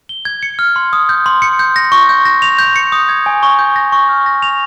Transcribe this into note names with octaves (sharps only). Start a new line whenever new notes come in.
G7
G#6
C#7
F6
C6
D#6
G6
C6
C#7
G6
A#6
C#6
G6
A#6
F7
G6
C#7
D#6
G#6
G#5
C#6
G6
A#6
C#6
F6
A#6
F7